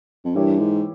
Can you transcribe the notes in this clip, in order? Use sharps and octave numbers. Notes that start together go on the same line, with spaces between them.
F2
G2 E3 A#3 E4 G4 C#5
G#2